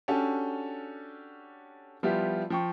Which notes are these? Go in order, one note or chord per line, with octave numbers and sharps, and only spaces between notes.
C#4 D4 F#4 G4 A4 G#5
F3 G3 B3 E4 F4 G4
F3 G5 C#6